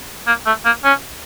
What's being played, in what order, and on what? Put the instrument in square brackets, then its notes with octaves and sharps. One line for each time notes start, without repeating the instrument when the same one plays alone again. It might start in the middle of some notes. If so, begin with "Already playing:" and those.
[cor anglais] A#3
A3
A#3
C#4